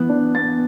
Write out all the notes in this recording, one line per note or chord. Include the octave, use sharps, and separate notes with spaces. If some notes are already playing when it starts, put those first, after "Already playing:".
Already playing: E3 B3 F#6
D4
B3 A6